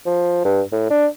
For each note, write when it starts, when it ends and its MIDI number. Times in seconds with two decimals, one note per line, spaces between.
0.06 0.45 53
0.45 0.61 43
0.72 0.88 45
0.90 1.06 62